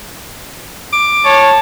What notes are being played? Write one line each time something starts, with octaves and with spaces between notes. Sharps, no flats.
D6
C#5 A5